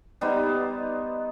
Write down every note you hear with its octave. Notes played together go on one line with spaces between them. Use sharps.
G3 B3 D#4 C5